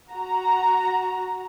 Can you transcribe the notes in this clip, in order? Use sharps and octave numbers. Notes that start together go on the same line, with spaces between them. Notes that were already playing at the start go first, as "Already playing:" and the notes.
F#4 A#5